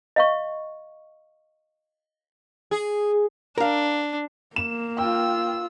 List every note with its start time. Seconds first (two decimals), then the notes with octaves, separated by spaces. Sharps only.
0.16 D#5 F5 C#6
2.71 G#4
3.58 D4 A#4 F5
4.56 A#3 E7
4.98 F4 G5 E6